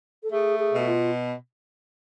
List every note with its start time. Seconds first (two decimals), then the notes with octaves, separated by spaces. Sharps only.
0.23 A4
0.31 A3 G#4
0.59 G#4
0.72 B2
0.79 F#4
0.86 F4